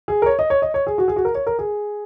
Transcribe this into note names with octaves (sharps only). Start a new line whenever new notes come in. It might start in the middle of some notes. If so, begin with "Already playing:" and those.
G#4
A#4
C#5
D#5
C#5
D#5
C#5
G#4
F#4
G#4
F#4
A#4
C#5
A#4
G#4